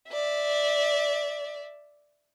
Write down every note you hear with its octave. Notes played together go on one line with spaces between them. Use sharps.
D5 E5